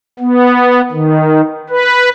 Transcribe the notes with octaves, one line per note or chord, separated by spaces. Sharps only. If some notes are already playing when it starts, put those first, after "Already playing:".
B3
D#3
B4